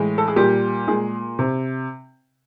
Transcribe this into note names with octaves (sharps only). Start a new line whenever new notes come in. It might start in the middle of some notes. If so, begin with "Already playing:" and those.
Already playing: A2 E3 G#3
A4
G#4
A#2 G3 G4
A#2 G#3 G#4
C3